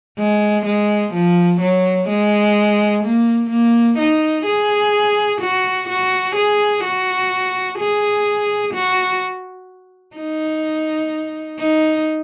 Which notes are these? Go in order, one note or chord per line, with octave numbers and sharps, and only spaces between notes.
G#3
G#3
F3
F#3
G#3
A#3
A#3
D#4
G#4
F#4
F#4
G#4
F#4
G#4
F#4
D#4
D#4